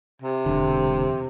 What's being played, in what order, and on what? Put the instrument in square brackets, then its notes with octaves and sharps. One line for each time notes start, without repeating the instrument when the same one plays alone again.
[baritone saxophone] C3
[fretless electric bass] E1 D3